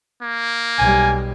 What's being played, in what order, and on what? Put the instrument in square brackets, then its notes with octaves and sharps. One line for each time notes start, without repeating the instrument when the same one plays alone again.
[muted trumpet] A#3
[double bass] B1 G3 [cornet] G#5